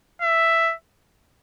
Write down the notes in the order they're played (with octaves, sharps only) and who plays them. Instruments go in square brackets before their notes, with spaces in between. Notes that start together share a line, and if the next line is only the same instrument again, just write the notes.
[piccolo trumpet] E5